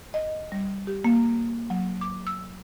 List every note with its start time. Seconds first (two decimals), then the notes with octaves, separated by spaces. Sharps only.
0.14 D#5
0.52 G3
0.87 G4
1.04 A#3
1.70 F#3
2.01 D6
2.27 E6